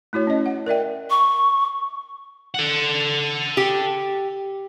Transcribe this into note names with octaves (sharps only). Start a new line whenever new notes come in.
A3 E4 F#4 C#5
C#4 D#5
F#5
A#4 D5 E5 G5
C#6
A4 F#5
G4